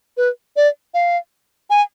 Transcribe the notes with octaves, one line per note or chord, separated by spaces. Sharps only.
B4
D5
F5
G#5